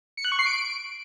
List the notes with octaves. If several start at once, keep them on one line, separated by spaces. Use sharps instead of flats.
C#7
F#6
C#6
C7
D7